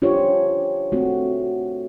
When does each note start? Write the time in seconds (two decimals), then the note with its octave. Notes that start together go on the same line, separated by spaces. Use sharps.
0.02 D4 F4 G4 C5 C#5
0.92 A3 C4 F#4